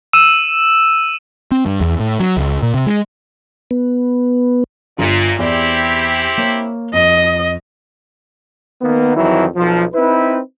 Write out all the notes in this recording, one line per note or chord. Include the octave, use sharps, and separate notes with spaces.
E6 D#7 E7
C4
G2
E2
A2
F#3
C#2
A#2
C3
G#3
B3
G1 A#2 F4
E2 C4 E4 G4 D5
A#3 C#5
F2 D#5
D#3 A#3 B3
F2 D#3 E3 F#3 E4
B1 F3
C4 D#4 E4 B4